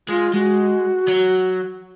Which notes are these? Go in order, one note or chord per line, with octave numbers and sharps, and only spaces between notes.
G#3 F4
G#3 F#4
F#3